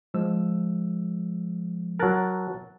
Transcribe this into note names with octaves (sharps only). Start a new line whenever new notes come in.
F3 G#3 E6
F#3 A#4 A5 F#6 A6